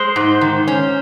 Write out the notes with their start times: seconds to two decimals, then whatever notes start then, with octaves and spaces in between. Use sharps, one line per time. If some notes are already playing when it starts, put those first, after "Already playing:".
Already playing: G#3 C5
0.16 G#2
0.41 D#3
0.68 C#4